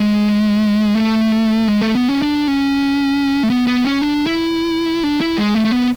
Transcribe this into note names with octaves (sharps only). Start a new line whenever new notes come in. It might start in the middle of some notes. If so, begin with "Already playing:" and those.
Already playing: G#3
A3
G#3
A3
B3
C#4
D4
C#4
A3
B3
B3
C#4
D4
E4
D4
E4
G#3
A3
A3
B3